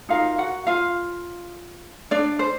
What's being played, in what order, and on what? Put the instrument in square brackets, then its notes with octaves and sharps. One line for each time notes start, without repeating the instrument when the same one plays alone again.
[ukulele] D#4 F4 F#4 A#4 F5
F#4 F#5
F4 F5
D4 D5
C5